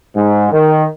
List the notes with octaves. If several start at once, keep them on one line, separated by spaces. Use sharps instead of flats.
G#2
D#3